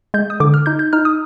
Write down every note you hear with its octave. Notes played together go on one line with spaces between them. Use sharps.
G#3 G6
D#6
D3 D6
F6
D#4 G6
G6
D#4 F6
D#6